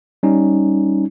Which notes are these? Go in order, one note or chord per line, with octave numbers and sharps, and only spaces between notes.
G3 C#4 D#4